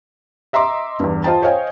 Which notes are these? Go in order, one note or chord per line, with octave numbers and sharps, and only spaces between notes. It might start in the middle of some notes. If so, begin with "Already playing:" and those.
D#5 E5 A#5 C6 D6
E2 G2
F4 C5 D#5 G5 A5
C5 C#5 D#5 F5 G5 G#5